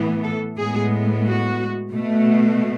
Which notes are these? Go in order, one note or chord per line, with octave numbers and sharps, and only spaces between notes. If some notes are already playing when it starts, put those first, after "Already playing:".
Already playing: A2 E3 B3
A4
A2 G#3 B3 G#4
F#4
B2 A3